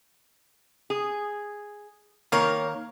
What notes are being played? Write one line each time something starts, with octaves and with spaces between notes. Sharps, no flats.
G#4
D#3 A#3 A#4 C#5 F5